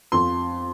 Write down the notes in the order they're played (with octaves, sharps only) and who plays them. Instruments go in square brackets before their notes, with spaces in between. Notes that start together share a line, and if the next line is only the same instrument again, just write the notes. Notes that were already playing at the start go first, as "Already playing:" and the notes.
[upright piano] F2 C6